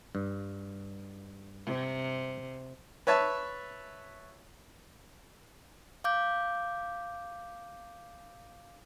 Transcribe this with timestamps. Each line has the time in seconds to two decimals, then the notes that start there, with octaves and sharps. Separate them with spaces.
0.15 G2
1.65 C3
3.07 B4 C#5 E5 A5
6.04 F5 D6 G6